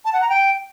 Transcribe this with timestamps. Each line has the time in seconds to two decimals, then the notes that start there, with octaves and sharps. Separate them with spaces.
0.05 A5
0.13 F#5
0.21 A#5
0.29 G5